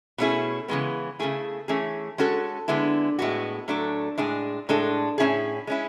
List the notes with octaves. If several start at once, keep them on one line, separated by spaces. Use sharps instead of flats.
B2 A3 C#4 E4 G#4
C#3 E3 G#3 B3
C#3 E3 A3 E4 G#4
E3 A3 C#4 G#4
G#3 C#4 F#4 A4
D3 G#3 B3 E4
A2 G#3 B3 F#4
A2 F#3 A3 D4 A4
A2 G#3 D4 G#4
A2 G#3 D4 A4
A2 F#3 C#4 E4 G#4
G#3 C#4 E4